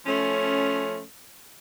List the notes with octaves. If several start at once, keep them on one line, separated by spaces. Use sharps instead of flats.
F3 A3 C#4